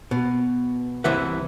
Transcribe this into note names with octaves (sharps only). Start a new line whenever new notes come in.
B2
C2 C3 E3 E5 F#5